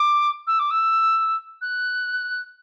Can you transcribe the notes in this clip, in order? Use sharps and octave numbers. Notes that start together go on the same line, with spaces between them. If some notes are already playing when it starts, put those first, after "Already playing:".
Already playing: D6
E6
D6
E6
F#6